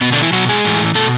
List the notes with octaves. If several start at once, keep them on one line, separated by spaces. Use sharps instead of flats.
B2 B3
D3 D4
E3 E4
B2 F#3 F#4
G#3 G#4
A2 E3
B2 A3 A4